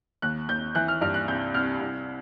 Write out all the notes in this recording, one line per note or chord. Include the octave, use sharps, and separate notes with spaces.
D#2 F#6
D#2 G6
E3 F#6
F6
G2 F6
F#6
C2 G6
C2 F6
C2